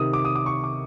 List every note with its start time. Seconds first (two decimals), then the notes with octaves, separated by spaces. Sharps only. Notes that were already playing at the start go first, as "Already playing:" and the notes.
Already playing: C3 D#3 D#6
0.13 D6
0.25 D#6
0.36 D6
0.46 C#6
0.64 D6